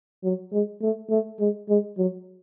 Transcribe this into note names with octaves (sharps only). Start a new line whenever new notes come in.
F#3
G#3
A3
A3
G#3
G#3
F#3